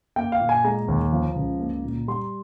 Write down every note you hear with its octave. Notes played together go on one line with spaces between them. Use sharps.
A#3 G5
F5
A#2
G#5
G#3 A#5
D#2
F3
C#2
A#3
A#2
G3 C6